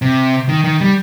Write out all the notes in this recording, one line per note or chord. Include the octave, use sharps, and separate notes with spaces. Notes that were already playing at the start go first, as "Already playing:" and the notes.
C3
D#3
D#3
G3